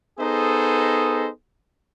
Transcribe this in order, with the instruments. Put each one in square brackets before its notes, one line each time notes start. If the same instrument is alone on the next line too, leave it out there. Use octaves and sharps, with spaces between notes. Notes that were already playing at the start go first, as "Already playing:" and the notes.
[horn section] B3 D#4 G#4 A4 C5 D#5